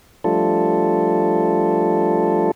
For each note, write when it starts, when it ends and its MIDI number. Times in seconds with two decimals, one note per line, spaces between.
0.24 2.51 53
0.24 2.51 55
0.24 2.51 57
0.24 2.51 62
0.24 2.51 65
0.24 2.51 69